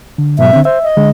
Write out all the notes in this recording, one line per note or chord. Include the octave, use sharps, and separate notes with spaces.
D3
G#2 B2 F#3 E5
D3 C4
C5 E5
D#5
D3 G#3